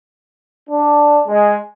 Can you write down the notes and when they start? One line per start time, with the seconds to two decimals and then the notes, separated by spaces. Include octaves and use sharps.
0.68 D4
1.27 G#3